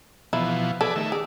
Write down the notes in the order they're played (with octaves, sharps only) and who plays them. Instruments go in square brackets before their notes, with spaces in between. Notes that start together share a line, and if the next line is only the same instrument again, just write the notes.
[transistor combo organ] B2 E3 F3 [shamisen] E4
[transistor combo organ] G#4 B4 D5 [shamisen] A4
[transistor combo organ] D#3 A3 E5
[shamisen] G#4 [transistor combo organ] D5